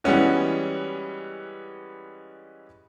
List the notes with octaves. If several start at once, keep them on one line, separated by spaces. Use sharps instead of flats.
E3 G3 G#3 B3 C#4 F#4